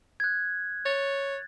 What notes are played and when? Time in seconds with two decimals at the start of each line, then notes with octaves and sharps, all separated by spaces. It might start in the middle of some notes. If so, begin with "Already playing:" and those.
0.20 F#6 G#6
0.86 C#5 A6